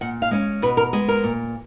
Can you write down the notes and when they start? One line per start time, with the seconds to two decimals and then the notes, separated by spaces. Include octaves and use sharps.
0.01 A#2 F#5
0.22 F5
0.31 G#3 C#4
0.62 B2 B4
0.77 A#4
0.93 G#3 B3 G#4
1.08 A#4
1.24 A#2